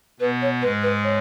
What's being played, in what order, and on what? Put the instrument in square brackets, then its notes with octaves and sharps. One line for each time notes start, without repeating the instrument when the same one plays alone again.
[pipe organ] B2 B3 [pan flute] B4
[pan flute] C#5
[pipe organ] G#2 G#3 [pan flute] B4
[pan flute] B4
C#5